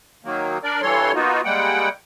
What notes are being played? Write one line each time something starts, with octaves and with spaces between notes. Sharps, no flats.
D#3 F#3 A#3
D4 A#4 D5
G2 E3 G3 A4 C#5 C6
A#3 B3 D#4 F4 F#4
G3 G#3 A#3 F#5 G5